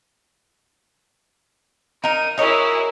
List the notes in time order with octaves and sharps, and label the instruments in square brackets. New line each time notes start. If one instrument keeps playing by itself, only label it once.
[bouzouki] D#4 A#4 [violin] D#7
[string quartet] E4 F#4 G#4 [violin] A#4 [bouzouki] C#5 D#5